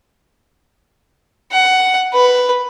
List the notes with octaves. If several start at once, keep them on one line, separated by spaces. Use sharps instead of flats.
F#5
B4